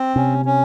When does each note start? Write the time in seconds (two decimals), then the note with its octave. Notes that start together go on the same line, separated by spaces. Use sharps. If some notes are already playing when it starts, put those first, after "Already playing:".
Already playing: C4
0.16 C3 C#4
0.45 C#4